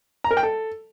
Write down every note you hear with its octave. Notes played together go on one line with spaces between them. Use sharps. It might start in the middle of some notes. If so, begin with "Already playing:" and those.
A#5
A#4
G5
A4